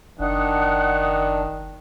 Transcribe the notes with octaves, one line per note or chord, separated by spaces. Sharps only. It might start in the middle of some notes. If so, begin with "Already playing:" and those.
F#1 D#3 D4 F#5 D#6 F#6